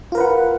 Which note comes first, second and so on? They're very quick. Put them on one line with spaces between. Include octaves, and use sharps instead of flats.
F4 A#4 B4 F#5